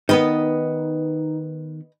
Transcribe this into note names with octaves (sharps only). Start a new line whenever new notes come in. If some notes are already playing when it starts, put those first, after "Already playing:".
D#3 B3 D#4 B4 D#5